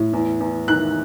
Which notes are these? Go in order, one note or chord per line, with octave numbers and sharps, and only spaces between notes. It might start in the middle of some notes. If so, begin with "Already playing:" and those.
Already playing: A2
E2
E2
D#3 F#6